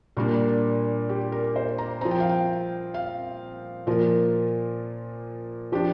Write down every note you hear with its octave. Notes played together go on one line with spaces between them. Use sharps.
A#2 G3 A#3 D4 A#4
G4
A#4
C5
A#5
F3 C4 A#5
G5
F5
G5
F5
A#2 F3 A#3 A#4
F3 D4 G4